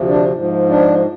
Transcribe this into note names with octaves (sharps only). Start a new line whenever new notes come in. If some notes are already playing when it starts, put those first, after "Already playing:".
Already playing: D2 C3 F3
D4
G#2 F3
D4